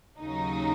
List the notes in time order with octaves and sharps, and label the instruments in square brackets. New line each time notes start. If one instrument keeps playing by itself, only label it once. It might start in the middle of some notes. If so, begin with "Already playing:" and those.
[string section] D#2 C#3 F#3 D#4